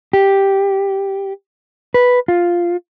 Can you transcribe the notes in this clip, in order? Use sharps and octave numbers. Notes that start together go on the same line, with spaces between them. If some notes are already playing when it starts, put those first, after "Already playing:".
G4
B4
F4